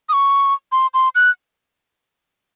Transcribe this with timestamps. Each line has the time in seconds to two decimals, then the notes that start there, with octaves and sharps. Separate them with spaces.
0.09 D#6
0.13 C#6
0.72 C6
0.94 C6
1.15 F#6